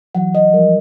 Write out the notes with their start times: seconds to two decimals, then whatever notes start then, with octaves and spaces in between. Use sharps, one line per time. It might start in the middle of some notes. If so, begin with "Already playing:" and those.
0.15 E3 F#3 F#5
0.35 D#5
0.53 F3 G3 A#4